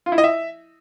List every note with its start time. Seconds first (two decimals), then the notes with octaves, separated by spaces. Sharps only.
0.06 F4
0.12 E4
0.18 D#5
0.24 E5